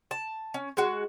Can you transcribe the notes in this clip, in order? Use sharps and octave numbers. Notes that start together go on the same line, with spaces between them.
A5
C#4
G#3 F#4